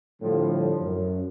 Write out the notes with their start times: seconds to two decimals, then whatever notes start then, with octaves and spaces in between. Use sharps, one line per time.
0.22 A2 D3 F3 G3
0.81 F#2